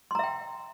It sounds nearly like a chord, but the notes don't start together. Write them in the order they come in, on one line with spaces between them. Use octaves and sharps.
C6 A#5 E5 G5